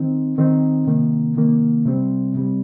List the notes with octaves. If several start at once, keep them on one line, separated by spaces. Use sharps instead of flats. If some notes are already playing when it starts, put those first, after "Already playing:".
Already playing: D#3 C4 D#4
D#3 C4 D#4
C3 D#3 A#3
C3 D#3 A#3
C3 G3 C4
C3 G3 C4